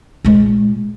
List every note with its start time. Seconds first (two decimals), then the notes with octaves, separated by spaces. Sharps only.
0.25 A#2 G#3